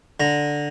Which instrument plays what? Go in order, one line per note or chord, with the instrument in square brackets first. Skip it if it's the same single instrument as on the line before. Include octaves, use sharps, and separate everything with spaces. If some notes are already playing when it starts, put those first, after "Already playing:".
[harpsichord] D3 A#5